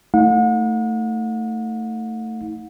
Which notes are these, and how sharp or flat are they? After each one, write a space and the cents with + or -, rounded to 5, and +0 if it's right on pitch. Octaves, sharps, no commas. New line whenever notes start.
A3 +20 D#4 +35 F#5 -40